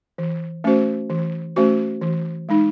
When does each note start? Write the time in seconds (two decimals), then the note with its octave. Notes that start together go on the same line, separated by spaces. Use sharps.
0.18 E3
0.64 A3 C#4 F#4 C5
1.10 E3
1.56 A3 C#4 F#4 C5
2.01 E3
2.49 G#3 D#4